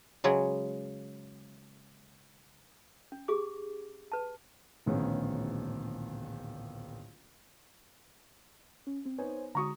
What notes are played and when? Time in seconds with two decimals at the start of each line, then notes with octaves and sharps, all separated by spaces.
0.24 C#3 F#3 G#3
3.12 C#4
3.28 G4 G#4 D6
4.12 B4 A5
4.86 D1 A#1 A2 D#3 B3 C#4
8.87 C#4
9.05 C4
9.18 B3 D#4 C5 C#5 G#5
9.55 D3 G#3 F#4 A#5 C#6 D#6